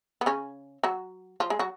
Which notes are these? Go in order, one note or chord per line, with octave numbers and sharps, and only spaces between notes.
B3
C#3 C#4
F#3 F#4
F3 F4
G#3 G#4
F#3 F#4